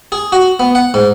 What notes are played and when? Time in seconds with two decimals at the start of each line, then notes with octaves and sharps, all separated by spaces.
0.12 G#4
0.32 F#4
0.60 B3
0.75 F#5
0.94 G#2